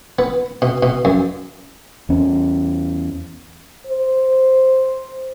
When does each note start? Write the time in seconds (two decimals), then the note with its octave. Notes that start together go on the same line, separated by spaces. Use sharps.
0.19 B3
0.62 B2
0.83 B2
1.05 F#2
2.09 E2 C#4
3.87 C5